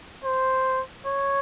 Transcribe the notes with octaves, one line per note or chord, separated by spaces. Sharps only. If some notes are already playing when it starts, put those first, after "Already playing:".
C5
C#5